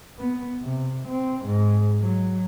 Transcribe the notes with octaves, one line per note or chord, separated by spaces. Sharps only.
B3
C3
C4
G#2
F#3